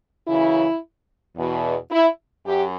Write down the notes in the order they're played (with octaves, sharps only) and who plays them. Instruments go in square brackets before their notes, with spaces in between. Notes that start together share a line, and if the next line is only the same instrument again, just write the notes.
[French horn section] F#2 C#3 E3 E4
E2 B2
E4
F#2 G4